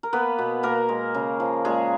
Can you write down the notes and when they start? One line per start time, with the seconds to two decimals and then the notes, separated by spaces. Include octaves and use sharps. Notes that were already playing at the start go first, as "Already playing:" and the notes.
0.03 A#4
0.13 A#3 B3 B4
0.38 B2
0.63 B2 A#3 A#4
0.89 G#3
1.14 C#3
1.40 F3
1.65 A#2 G#3 G#4